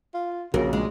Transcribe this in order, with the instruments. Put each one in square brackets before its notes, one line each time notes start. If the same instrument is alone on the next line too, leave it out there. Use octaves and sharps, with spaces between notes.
[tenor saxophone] F4
[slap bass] A#1 [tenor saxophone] C#3 [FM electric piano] F#4 [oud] A#4
[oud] G#3